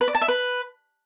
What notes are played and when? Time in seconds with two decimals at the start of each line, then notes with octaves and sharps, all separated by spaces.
0.01 B4
0.08 D5
0.15 A5
0.21 E5
0.28 B4